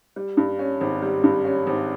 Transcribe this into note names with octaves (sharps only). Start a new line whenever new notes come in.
G3
G2
C#4
G#1
G3
G2
C#4
G#1